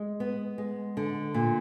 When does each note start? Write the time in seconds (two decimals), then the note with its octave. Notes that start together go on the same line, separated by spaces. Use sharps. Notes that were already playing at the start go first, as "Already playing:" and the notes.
Already playing: G#3
0.20 B3
0.58 G#3
0.97 D3
1.34 A#2